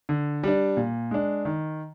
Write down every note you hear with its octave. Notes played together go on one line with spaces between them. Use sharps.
D3
G3 D4
A#2
G#3 D4
D#3